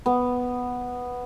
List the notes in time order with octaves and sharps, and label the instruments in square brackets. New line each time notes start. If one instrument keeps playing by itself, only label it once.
[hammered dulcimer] B3